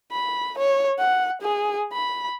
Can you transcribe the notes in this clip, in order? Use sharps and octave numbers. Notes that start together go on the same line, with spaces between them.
B5
C#5
F#5
G#4
B5